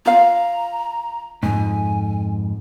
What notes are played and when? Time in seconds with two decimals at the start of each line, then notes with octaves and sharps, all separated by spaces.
0.06 F4 F5 A#5
1.43 F2 G#2 G#5